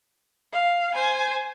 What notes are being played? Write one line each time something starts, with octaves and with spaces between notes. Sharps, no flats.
F5
C5 G#5